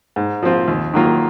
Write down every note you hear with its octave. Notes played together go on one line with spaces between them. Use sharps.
G#2
F3 C4 F4
D#2
D#3 F#3 A#3 F4